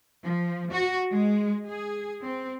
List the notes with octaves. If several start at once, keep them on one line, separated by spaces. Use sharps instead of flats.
F3
F#4
G#3
G#4
C4